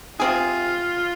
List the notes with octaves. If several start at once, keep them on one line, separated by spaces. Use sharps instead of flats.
C3 F3 C4 F4 G#4